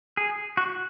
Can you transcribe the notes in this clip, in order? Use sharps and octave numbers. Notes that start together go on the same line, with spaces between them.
G#4
F#4